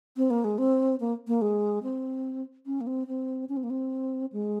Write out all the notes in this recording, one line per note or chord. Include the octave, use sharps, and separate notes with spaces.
C4
A#3
G#3
C4
A#3
A#3
G#3
C4
C#4
A#3
C4
C4
C#4
C4
A#3
C4
G#3